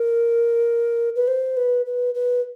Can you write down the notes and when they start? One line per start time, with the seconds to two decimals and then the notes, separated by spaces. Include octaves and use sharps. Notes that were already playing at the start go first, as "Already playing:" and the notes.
Already playing: A#4
1.16 B4
1.28 C5
1.57 B4
1.86 B4
2.15 B4